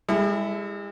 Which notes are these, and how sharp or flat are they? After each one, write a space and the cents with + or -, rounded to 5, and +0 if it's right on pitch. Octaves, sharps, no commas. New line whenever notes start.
G#3 -45 E4 +0 A4 -25